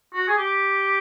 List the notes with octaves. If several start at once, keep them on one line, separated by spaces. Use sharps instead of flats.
F#4
G#4
G4